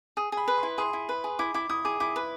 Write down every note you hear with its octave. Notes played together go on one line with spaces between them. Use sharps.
G#4 D#6
G#4 B5
B4
C6
E4
G#4 C6
E4
B4
G#4
E4 D6
E4 D6
E4 D#6
G#4 D6
E4 D6
B4